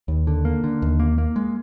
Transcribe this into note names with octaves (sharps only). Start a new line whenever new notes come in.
D#2
D3
A#3
D3
D#2
A#3
A#3
G#3